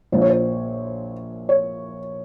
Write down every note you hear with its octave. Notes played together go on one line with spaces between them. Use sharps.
A#1 A#2 F3 C5
C#5
C5
C#5